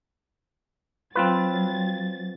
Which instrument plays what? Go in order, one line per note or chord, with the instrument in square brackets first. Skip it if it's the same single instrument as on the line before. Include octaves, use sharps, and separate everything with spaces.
[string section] F#3 A6 [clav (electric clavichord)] C4 F4 B4